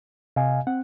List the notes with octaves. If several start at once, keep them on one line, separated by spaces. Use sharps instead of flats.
C3 D#5 F5 G#5
C4 F#5